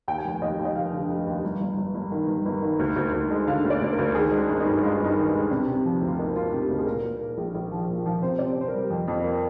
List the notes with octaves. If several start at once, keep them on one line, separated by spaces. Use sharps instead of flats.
D#2 G5
G#5
F1 G5
D#2 D#5
D#2
D#5
F1 F5
D3
F1
D#2
G1
G1
G1
G1
D#3
G1
G1
D#3
D2
D2
D2
G#3
D3 F5
D2
D5
D2
A#4
D2
D#3 G#4
G#3
D4
G#1
D#4
G2
G#3 F4
G2
D#4
D#3
D#4
G#3
C3 D4
C3
F3
D2
F4
A#3 D#4
A#3 F4
C3 G4
D2
G#4
A#2 A#4
A#2
A#3
A#1
A#1
F3
A#2
F3
C3 C5
C3 D5
C5
C3 C5
A#4
G3
F2
F2
A#3